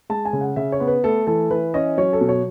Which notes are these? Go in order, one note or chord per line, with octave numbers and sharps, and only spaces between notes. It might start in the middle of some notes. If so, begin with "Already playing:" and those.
G#3 A5
G#5
C#3
F#5
C#3 E5
C#5
B3
B4
A3 A4
E3 A4
E3 B4
C#4 D#5
F#3 C#5
A4
B2
C#5